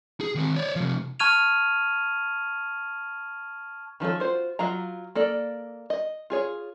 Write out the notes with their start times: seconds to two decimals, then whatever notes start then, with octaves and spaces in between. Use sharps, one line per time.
0.21 G#4
0.35 D#3 C4
0.56 C#5 D5
0.76 C3 F3
1.19 A5 C#6 F6 G#6 D#7 F7
4.00 D#3 F3 C#4 A4
4.20 F4 F#4 C5
4.59 F#3 F4 F5 A#5
5.15 A#3 A4 D5
5.90 D#5
6.30 F4 G#4 C#5